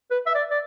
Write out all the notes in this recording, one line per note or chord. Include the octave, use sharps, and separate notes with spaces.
B4
E5
D5
D5